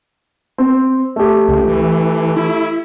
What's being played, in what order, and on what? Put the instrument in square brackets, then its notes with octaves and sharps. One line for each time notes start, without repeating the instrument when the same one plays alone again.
[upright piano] C4
A3 G4
[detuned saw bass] C#2
E3
E4